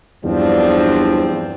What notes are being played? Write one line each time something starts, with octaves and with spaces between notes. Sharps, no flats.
E2 G2 F3 F#3 C4 D4